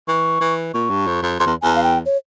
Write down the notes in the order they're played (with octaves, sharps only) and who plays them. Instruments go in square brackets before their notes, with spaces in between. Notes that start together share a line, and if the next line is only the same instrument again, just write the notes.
[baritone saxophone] E3 [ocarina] C#6
[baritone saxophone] E3
[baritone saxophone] A#2 [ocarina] C#6
[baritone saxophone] G2
F2
F2
[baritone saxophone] F2 [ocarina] C6
[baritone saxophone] E2
[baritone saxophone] E2 [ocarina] G#5
[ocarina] F5
G5
C#5